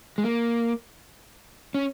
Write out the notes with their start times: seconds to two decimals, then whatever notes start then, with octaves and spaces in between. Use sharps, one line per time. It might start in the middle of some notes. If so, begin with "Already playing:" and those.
0.18 G#3
0.24 A#3
1.74 C#4